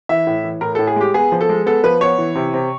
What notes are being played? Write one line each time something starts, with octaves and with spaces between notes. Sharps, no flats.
E3 E5
A2
E3
A2 A#4
A2 A4
G#4
G#3 G4
B3 G#4
F3
A4
G#3
B3 A4
F3 B4
B3 C#5
E3
C3
C3